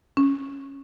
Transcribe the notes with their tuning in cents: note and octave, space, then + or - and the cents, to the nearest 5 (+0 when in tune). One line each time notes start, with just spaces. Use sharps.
C#4 -5